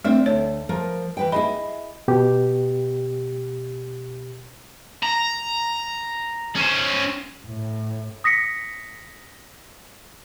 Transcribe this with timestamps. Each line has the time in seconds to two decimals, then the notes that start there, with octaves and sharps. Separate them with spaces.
0.04 A3 C4 D4 E5
0.26 D2 C#5
0.69 F3 A#4
1.17 E3 B4 G5
1.32 E4 G#4 D#5 B5
2.08 B2 G4
5.03 A#5
6.56 C#4 C5
7.46 A2
8.24 D#6 A#6 B6 C#7